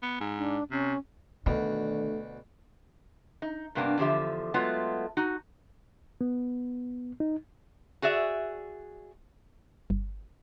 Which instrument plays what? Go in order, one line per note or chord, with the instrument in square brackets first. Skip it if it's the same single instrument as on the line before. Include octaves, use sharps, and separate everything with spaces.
[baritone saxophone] B3
G#2
[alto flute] D4
[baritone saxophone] C3 [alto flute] C#4
[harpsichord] D2 B2 [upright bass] D#3 [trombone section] A3 D4
[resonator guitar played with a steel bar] D#4
G2 C3 A#3 B3 D4
E2 D3 F3 G4 E5
F#3 G#3 A3 B3 F4
D#4 F#4
[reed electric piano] B3
D#4
[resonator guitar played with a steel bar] F#4 G#4 D5 E5
[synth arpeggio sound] G1